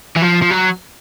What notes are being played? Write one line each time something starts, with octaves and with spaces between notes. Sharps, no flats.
E3
F3
F3
F#3